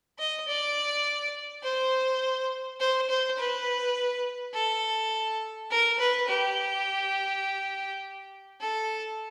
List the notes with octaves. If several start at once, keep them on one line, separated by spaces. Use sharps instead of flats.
D#5
D5
C5
C5
C5
B4
A4
A#4
B4
G4
A4